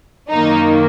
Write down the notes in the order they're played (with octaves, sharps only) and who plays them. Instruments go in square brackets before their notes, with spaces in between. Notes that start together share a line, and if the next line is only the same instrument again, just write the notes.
[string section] F#2 D#3 A#3 D#4